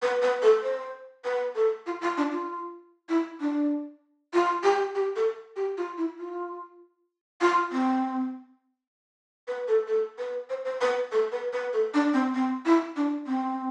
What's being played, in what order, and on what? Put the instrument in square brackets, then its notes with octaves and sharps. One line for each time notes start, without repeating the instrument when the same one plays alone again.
[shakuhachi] B4
B4
A4
C5
B4
A4
F4
F4
D4
F4
E4
D4
F4
G4
G4
A4
G4
F4
E4
F4
F4
C4
B4
A4
A4
B4
C5
C5
B4
A4
B4
B4
A4
D4
C4
C4
E4
D4
C4